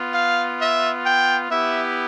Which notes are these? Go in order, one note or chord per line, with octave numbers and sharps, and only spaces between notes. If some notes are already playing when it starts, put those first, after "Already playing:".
Already playing: B3 F4
F5
E5
G5
B3 E4 G4 E5